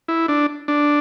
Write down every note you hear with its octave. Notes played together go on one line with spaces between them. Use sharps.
E4
D4
D4